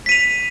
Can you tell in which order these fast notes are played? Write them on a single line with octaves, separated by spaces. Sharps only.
B6 D#7 F7